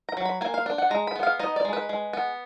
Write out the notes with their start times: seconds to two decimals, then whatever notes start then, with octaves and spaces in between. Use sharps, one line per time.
0.09 A#5
0.17 F#3
0.25 B5
0.41 A#3 G#5
0.54 F5
0.66 D4
0.78 F#5
0.91 G#3 A#5
1.07 B5
1.16 B3
1.23 F5
1.39 D#4 D#5
1.56 D5
1.65 G#3
1.73 B4
1.89 G#3
2.13 B3